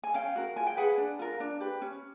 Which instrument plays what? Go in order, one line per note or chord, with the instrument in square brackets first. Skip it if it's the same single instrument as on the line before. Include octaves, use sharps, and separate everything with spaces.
[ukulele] G#5
C#4 F5 G5
F#4 A#4
F4 G#5
G5
G#4 B4 F#5 G#5
D4
F4 A#4
D4
G4 B4
C#4